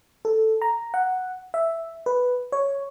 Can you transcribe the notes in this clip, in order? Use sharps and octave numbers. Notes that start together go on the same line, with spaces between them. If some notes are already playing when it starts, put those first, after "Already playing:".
A4
A#5
F#5
E5
B4
C#5